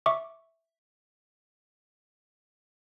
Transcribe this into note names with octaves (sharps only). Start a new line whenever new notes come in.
E5 C#6 D6